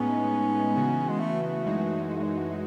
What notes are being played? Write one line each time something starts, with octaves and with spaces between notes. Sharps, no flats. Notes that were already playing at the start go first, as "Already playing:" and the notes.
Already playing: A2 G#3 B3 C#4 D#4
C#3 E3 B3 F#4
G#3
A3
A3
F#2 E3 G#3 D#4 F#4
G#3
A3
G#3
A3